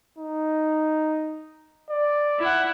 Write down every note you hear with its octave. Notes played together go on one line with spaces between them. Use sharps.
D#4
D5
E4 F#5